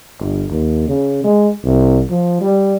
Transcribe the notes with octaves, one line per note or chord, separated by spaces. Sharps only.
G1
D#2
C#3
G#3
C2
F3
G3